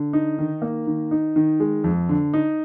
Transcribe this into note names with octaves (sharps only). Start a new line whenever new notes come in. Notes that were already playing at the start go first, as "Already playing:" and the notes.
Already playing: D3
D#4
D#3
A#3
D#3
D#4
D#3
G#3
F2
D3
D#4